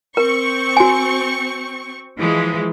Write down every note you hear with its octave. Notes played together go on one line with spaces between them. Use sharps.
C4 A#4 C#6
F#4 G#5
E3 F3 G#3